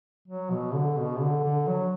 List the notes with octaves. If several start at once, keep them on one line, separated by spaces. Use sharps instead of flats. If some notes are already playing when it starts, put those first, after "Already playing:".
F#3
B2
D3
B2
D3
D3
F#3